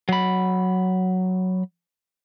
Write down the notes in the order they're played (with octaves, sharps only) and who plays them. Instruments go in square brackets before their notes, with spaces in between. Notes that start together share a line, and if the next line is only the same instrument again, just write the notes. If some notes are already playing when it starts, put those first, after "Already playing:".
[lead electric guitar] F#3 B5